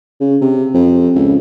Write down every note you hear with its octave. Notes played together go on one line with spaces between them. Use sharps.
C#3
C3
F2
C#2